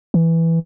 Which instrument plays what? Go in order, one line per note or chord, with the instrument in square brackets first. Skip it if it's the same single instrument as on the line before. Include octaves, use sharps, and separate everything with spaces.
[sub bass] E3